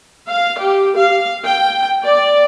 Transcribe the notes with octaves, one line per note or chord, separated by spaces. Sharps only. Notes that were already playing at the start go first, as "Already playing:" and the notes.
F5
G4
F5
G5
D5